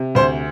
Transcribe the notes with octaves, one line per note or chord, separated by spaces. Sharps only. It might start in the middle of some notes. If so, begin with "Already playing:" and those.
Already playing: C3
D2 C5